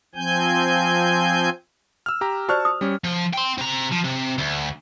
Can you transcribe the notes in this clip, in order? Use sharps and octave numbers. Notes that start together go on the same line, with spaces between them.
F3 C4 G#5 G6
E6 F6
G4 A#5
F#4 C5 D5 A5 C#6 F6
D#6
G3 C#4
F3
G5 C6
C3 A#5
F3
C3
D2